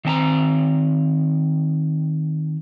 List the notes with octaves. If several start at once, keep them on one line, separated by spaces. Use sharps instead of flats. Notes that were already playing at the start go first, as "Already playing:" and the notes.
D#3 C4 A5 A#5